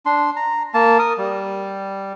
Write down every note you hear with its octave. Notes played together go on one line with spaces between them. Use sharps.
D4 C6
A#5
A#3 A5
A#4 D#6
G3